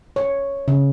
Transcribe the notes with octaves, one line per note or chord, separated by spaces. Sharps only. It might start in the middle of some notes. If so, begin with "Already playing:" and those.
C#5
C#3